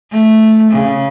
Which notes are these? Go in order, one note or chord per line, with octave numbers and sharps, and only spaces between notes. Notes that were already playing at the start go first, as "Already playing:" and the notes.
A3
C#3